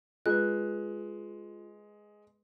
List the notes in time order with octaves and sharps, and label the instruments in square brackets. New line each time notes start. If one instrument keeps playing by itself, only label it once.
[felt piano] G#3 [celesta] F4 [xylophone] B4 F#6